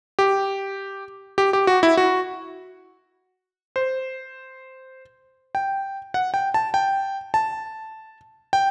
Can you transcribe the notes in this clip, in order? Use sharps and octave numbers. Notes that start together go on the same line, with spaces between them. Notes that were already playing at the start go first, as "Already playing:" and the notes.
G4
G4
G4
F#4
E4
F#4
C5
G5
F#5
G5
A5
G5
A5
G5